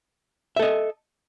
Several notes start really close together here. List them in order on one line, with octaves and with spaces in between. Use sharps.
E5 A4 D#5